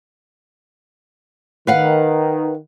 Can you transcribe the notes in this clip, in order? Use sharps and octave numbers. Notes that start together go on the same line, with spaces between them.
D#3 B4 F5 F#5